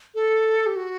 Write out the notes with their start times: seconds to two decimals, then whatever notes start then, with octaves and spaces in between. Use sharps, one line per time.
0.15 A4
0.66 G4
0.76 F#4